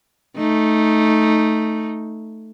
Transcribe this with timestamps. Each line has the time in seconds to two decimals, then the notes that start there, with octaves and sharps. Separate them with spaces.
0.37 A3 D#4